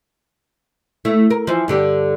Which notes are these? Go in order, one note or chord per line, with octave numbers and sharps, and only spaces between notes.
A3 E4
A#4
E3 F3
G2 D3 G4